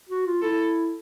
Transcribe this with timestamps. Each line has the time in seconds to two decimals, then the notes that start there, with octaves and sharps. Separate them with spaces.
0.09 F#4
0.26 F4
0.42 E4 A4